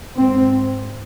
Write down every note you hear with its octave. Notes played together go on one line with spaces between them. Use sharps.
G#2 C4